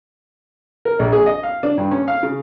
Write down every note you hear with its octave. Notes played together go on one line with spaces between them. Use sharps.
A#4
A#1
G#4
D#5
F5
D4
G2
C#4
F5
C#3